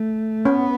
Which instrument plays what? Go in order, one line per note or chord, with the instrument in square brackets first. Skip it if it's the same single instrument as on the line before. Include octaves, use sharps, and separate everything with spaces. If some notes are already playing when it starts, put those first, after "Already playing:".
Already playing: [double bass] A3
[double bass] B3 [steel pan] C#4